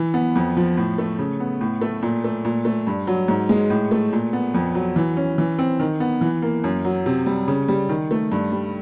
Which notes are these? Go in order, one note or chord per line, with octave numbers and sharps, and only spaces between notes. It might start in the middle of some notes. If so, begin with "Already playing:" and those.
Already playing: E3
B3
F2
F3
A2
A3
C#3
B3
A2
A3
A#2
A3
A#2
A3
G2
F#3
G#2
G#3
A2
A3
A#2
B3
F2
F#3
E3
C#4
E3
C4
D#3
B3
E3
A#3
F#2
F#3
C3
G3
C#3
G3
D#3
A3
G2
G3